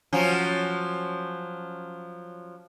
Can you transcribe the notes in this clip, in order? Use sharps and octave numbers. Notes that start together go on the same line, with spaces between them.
F3 F#3 C#4